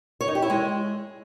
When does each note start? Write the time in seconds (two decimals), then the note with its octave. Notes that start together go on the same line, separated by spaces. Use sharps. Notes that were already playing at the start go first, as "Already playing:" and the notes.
0.21 C#5
0.28 D#4
0.35 G4
0.42 E4
0.50 G#3